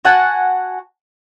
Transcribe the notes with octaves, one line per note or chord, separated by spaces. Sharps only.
F#4 F#5 G#5 A5